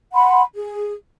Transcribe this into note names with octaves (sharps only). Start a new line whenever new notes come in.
F#5 B5 C6
G#4